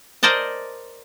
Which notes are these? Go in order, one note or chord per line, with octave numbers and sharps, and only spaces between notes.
A#4 C5 D5 D#5 A5